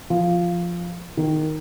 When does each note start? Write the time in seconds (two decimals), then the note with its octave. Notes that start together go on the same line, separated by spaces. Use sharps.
0.10 F3
1.17 D#3